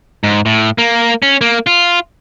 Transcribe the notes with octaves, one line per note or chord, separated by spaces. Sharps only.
G#2
A2
A#3
C#4
A#3
F4